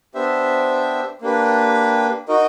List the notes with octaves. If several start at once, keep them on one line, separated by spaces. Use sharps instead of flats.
B3 D4 G4 C5 E5
A#3 D4 G4 B4
D#4 F#4 A#4 D#5